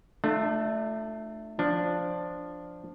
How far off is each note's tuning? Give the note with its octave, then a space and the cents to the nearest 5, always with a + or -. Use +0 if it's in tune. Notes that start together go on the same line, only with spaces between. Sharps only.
A3 +0 D4 +35 F4 +0
F3 +0 D4 +0